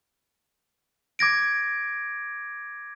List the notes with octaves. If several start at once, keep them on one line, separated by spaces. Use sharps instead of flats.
D6 G#6 A#6 D7